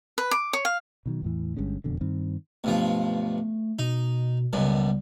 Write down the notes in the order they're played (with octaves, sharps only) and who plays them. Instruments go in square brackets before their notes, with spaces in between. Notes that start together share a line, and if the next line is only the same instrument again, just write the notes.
[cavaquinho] B4
D6
C#5
F5
[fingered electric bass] B2 D#3 F#3
E2 A2 E3
G1 G2 G#3 C#4
E1 F2 B2 D3
G2 D#3 C4
[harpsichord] B1 G2 F3 [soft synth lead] A3
[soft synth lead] B2 [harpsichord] D#4
[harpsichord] C#2 F#2 B2 [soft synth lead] G3